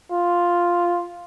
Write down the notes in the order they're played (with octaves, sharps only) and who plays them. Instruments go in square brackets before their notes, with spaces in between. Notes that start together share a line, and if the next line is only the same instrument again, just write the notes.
[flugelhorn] F4